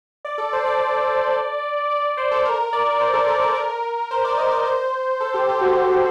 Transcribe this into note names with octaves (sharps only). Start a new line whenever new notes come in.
D5
A4
C5
D5
D5
D5
C5
A4
A#4
D5
C5
A4
A#4
D5
A#4
C5
D5
D#5
D5
C5
A4
G4
G4
F#4